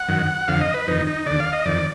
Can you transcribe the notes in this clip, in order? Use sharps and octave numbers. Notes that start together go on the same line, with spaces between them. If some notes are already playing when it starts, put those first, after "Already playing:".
Already playing: F#5
F#2 D#3
F2 D3 F5
D#5
B4
F2 D#3 D#4
D#4
D#2 D3 D5
F5
D#5
F2 D#3 D5